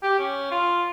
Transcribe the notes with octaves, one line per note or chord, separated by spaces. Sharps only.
G4
C#4
F4